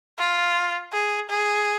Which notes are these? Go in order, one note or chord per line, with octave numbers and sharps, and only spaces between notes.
F4
G#4
G#4